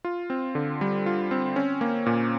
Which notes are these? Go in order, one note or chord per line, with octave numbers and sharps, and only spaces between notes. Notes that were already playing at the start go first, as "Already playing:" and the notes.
F4
C4
D3
G3
F4
C4
C#4
A#3
A#2